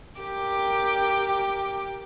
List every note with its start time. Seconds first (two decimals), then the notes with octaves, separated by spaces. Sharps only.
0.19 G4 A#4 G5 D6